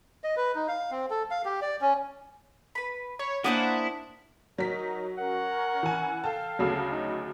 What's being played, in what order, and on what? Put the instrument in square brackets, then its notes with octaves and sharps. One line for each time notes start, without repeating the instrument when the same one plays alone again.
[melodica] D#5
B4
D#4
F5
C4
A4
F5
G4
D5
C#4
[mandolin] B4 B5
[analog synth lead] C#5 [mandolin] B5
[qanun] A#3 D4 C5 [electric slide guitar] E4 [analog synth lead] F#5 [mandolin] G#5 D#6
[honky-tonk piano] F#3 B6 [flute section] D#4 [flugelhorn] A#4
[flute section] C#4 A#4 [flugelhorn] F#5
[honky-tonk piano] E3 G#5
[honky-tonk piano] A4 G5 A5 [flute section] F5 F6
[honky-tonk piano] D2 C#3 F#3 [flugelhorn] A4
[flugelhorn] D#4